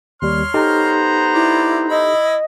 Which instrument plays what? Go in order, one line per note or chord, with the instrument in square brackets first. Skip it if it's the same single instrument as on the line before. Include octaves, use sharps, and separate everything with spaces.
[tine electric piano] D#2 G3 [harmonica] C#5 C6 F6
[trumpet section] B3 C5 A#5 [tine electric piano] D#4 G4 A4
[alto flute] E4 [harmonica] D5
[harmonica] E4 B5 [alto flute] D#5